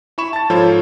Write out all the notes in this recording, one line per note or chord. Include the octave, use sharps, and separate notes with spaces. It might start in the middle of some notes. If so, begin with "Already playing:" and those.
E4 B5 C#6 E7
A5 A6
G#2 F3 F4 A4 C#5 G#6